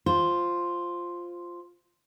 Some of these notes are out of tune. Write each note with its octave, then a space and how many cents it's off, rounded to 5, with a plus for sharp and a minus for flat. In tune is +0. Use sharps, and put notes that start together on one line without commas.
F4 +0 C5 +0